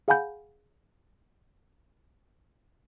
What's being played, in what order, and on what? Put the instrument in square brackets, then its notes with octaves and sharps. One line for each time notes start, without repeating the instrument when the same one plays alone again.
[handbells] G#4 F5 F#5 G#5 B5 G6